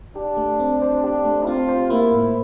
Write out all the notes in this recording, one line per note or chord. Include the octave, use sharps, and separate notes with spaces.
D4 G4
A3
C4
C5
D4 G4
A3
C4 F4
C5
A#3 E4
A2